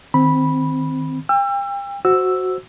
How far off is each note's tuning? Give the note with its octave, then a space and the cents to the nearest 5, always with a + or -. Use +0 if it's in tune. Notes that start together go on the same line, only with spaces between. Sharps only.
D#3 +0 C4 -5 B5 -10
G5 +35 E6 +30
F#4 +0 C5 +0 E6 +0